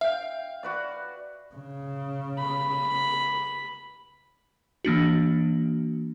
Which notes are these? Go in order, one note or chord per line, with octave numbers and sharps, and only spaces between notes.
E5 F5 G5
F#4 B4 D5
C#3
B5
E3 A#3 D4 F#4